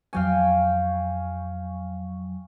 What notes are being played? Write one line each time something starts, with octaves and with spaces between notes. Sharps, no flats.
F2 F#3 F5 G5 G#5 C#6